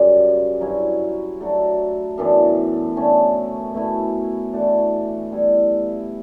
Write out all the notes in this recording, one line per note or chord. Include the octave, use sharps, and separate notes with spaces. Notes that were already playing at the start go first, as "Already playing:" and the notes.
Already playing: F#2 C#3 G3
G2 F#3 C#4 E4
F#3 A3 D4 A4
F#2 E3 B3 D4
D3 A3 C#4
B2 A3 E4
E3 A3 D4 F#4
G3 B3 E4